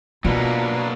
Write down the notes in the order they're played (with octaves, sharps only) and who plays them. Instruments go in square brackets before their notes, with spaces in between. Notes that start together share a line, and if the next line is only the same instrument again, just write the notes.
[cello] B2 [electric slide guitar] F#3 A#3 [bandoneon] D4 B4 F5 [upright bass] F4